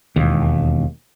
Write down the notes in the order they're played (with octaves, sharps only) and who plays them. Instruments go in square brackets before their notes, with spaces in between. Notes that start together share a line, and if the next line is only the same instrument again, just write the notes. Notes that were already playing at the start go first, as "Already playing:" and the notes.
[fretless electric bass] E1 D#2